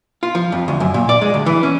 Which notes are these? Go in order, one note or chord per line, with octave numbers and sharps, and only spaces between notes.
F4
F3
F2
D2
F#2
A#2
D5
G#3
D2
E3
C#4